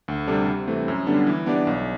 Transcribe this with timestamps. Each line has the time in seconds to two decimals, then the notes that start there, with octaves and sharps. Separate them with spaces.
0.08 D2
0.27 C3 G3 D4 A4
0.47 C3
0.68 E3 A3 C4
0.88 F#2
1.07 D3 G3 B3 D4
1.26 E3
1.46 B3 D4 G4 D5
1.67 B1